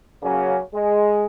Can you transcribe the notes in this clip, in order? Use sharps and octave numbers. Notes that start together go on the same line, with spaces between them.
C#3 F#3 A#3 C#4
G#3